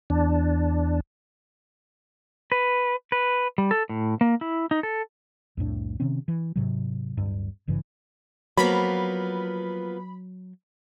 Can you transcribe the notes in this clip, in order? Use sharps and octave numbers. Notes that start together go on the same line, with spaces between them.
E2 D4
B4
B4
G3
A4
A2
A#3
E4
D#4
A4
C2 F2 A2 D4
C3 D#3 C4 C#4
E3
G#2 C3 F#3
D1 G2
G#1 G2 C#3 E3
F3 F#3 A#3 B3 B5